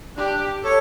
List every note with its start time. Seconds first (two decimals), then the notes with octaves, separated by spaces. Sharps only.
0.17 D4 G4
0.64 A4 C#5